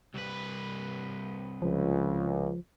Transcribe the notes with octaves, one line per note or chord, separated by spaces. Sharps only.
C2 B4
C#2 F3